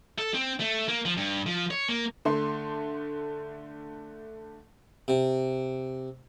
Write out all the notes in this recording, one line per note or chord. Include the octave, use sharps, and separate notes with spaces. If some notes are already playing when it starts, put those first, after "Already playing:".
A4
C4
A3
A#3
F3
G2
F3
C#5
A#3
D3 A3 C6
C3